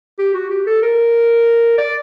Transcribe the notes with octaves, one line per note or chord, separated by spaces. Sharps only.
G4
F#4
G4
A4
A#4
D5